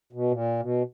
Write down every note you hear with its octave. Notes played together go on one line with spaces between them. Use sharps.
B2
A#2
B2